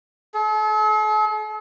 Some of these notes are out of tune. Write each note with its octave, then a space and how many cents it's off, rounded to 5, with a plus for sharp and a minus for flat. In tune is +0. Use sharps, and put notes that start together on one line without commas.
A4 -45